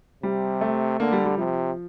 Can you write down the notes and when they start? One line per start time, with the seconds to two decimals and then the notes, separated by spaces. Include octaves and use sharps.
0.23 C3 G3
0.61 A3
1.00 D3 A#3
1.13 G3
1.26 G3
1.37 C3 F3